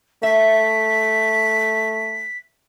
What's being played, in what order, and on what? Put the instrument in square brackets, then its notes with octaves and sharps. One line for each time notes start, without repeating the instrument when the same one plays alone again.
[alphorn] A3 [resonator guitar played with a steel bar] E5 [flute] B6